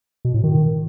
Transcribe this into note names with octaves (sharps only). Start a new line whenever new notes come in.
B2
A2
D#3